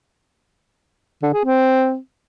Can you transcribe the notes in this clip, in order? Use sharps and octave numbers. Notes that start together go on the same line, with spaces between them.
D3
G#4
C4